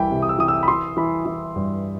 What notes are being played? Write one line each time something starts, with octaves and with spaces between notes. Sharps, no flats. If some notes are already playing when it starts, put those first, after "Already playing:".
Already playing: C2 E3 G5 B5
C3
D#6
E6
E3 D#6
E6
B5
E3 C6
E3 B5
E3
G2